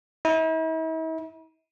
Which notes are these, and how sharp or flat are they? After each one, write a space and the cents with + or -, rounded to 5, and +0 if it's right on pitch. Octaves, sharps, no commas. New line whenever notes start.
E4 -45